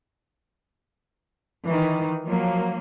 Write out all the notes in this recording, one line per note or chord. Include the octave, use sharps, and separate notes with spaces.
D#3 E3
F3 F#3 A#3